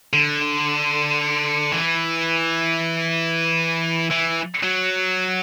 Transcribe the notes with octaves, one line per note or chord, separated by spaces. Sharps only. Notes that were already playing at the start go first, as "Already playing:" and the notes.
D3
E3
E3
F#3